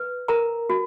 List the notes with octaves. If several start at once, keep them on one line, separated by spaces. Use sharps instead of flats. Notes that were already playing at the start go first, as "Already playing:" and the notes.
Already playing: B4
A#4 A#5
F#4